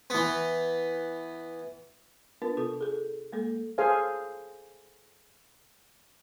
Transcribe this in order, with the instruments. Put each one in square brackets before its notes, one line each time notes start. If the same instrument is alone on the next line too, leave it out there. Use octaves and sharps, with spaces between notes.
[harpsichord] E3 B3
[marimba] B3 D4 F4 A#4 B4 A6
C3 B3 F4 A4
G#4 A4
G#3 A#3 A4
[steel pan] G#4 A4 C5 F5 G#5